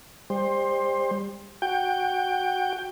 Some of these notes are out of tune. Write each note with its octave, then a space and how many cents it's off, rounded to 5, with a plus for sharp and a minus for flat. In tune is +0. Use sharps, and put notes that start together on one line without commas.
G3 +30 C5 +15
F#4 +0 G5 +15